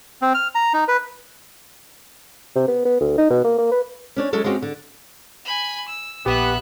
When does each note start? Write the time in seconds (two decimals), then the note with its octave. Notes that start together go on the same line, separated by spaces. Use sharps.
0.22 C4
0.35 F6
0.55 A#5
0.73 D#4
0.88 B4
2.56 C3
2.68 B3
2.85 B3
3.01 D2
3.18 D#4
3.30 B2
3.44 A#3
3.58 A#3
3.71 B4
4.16 C#4 D4 C#5
4.33 F#3 G#3 C#4 A4
4.44 G#3 C4 C#4 F#4 G4
4.62 D3
5.45 G#5 B5
5.88 E6
6.26 A#1 B3 G4 E5 F#6